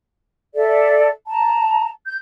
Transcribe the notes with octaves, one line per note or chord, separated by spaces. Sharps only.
A4 D5 E5
A5 A#5
G6